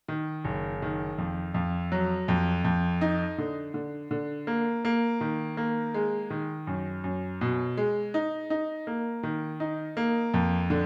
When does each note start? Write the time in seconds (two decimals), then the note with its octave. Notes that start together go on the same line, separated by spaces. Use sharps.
0.08 D#3
0.45 F#1
0.82 D#3
1.18 F2
1.54 F2
1.92 F#3
2.28 F2
2.64 F2
3.01 D#4
3.38 D3
3.74 D3
4.11 D3
4.47 A#3
4.85 A#3
5.21 D#3
5.57 A#3
5.94 G#3
6.30 D#3
6.67 F#2
7.04 F#2
7.41 B2
7.77 G#3
8.14 D#4
8.50 D#4
8.87 A#3
9.23 D#3
9.60 D#4
9.97 A#3
10.34 F2
10.70 D3